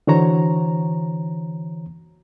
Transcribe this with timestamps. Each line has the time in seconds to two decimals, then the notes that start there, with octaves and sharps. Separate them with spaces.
0.07 D3 E3 F#4 C5 C#5 A#5